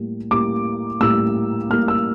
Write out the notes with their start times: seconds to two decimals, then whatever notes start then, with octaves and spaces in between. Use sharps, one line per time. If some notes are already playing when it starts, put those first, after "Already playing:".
Already playing: A2 G3 A#3
0.31 A2 G3 A#3 D6
1.01 A2 G3 A#3 E6
1.70 A2 G3 A#3 F6
1.88 E6